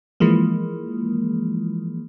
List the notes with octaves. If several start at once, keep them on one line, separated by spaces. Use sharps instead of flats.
E3 F3 G#3 A#3